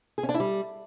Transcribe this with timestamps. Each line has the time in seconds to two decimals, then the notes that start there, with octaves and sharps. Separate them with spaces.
0.18 G#4
0.23 C#4
0.29 D4
0.34 E4
0.40 G3